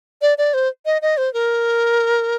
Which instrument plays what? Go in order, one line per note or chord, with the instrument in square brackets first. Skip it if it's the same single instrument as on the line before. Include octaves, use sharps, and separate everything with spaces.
[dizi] D5
D5
C5
D#5
D#5
C5
A#4